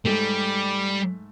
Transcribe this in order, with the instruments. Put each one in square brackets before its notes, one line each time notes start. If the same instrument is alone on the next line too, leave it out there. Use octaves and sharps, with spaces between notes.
[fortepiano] G#2 A3 [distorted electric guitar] G3